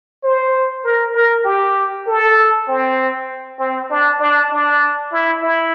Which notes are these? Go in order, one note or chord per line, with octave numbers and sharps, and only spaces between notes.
C5
A#4
A#4
G4
A4
C4
C4
D4
D4
D4
E4
E4